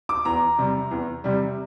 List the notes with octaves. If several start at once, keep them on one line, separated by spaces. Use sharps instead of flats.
D6
E2 A#5
C3 G3
E2
C3 G3